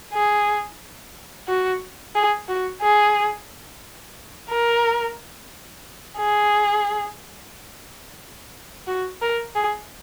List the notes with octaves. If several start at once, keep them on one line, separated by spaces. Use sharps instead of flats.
G#4
F#4
G#4
F#4
G#4
A#4
G#4
F#4
A#4
G#4